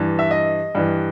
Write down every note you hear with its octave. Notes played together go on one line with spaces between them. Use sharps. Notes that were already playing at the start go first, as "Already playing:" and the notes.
Already playing: G2 E3
E5
D#5
G2 E3